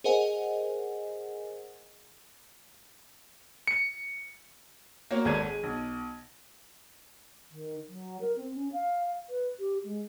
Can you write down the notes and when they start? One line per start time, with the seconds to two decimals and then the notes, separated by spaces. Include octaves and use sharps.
0.04 G#4 A#4 C5 D#5 F#5 G#5
3.67 C#7
5.11 A#3 F#4 C#5
5.25 G#1 D#2 A4 D5 G#6 D#7
5.45 G#3
5.63 B1
7.51 D#3
7.89 F#3
8.21 A#4
8.36 C4
8.54 C#4
8.73 F5
9.29 B4
9.59 G4
9.84 G#3